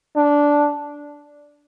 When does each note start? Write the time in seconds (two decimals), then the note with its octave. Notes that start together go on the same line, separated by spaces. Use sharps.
0.16 D4